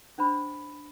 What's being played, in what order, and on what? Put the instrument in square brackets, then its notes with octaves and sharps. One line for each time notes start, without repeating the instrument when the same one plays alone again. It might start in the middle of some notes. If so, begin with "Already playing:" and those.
[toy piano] C#4 D4 C5 B5